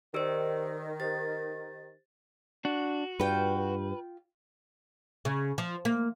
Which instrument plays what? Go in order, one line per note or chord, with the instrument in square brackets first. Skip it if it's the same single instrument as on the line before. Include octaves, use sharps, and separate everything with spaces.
[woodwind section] D#3 [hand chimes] G4 C5 [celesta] D5 E6 D7
[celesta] G4 C5 [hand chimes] A6
[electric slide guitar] D4 [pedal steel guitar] F#4
[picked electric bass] G2 [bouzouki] F4 G5 [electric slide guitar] B4
[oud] C#3
F3
A#3